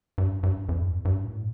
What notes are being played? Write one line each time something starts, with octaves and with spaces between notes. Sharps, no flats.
G2
G2
F2
G2
G2
A2